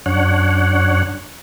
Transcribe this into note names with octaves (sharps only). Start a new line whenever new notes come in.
F#2 D4 C#5 F#5